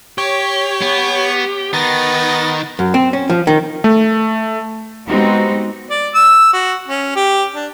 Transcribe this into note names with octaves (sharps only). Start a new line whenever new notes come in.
G4 C#5
B3
D#3 B3 A6 A#6
F#2
C4
C#4
F3
D#3
A3
G#3 B3 C4 D#4 F#4 G4
D5
E6
F#4
C#4
G4
D4